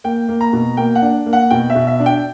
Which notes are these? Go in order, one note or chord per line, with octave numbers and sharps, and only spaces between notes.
A#3 G5
A#3
A#5
B2
A#3 G5
F#5
D4
A#3
F#5
B2 G5
E5
B2
E5
D4
G5